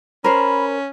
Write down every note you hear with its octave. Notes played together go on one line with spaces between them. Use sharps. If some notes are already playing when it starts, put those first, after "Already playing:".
C#4 A#4 C5 B5